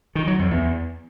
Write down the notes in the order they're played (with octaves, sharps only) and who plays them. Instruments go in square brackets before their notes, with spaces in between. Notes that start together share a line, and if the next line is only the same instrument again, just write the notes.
[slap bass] D#3
F#3
F2
E2